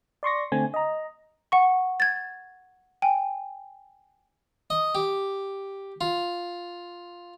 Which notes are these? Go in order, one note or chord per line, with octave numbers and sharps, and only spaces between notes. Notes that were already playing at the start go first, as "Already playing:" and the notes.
D5 C6 C#6 A#6
D3 A3 C4 G#5
D#5 A#5
F#5 C#6
G#6 A6
G5 G#5
D#5
G4
F4